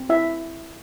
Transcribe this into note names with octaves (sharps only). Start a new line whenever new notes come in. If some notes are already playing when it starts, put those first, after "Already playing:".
Already playing: C4
E4 E5